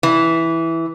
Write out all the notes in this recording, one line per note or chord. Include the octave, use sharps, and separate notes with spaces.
E3